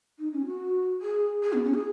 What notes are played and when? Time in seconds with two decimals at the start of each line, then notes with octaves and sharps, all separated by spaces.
0.19 D#4
0.33 C#4
0.46 F#4
1.02 G#4
1.43 G#4
1.53 B3
1.64 C#4
1.74 G#4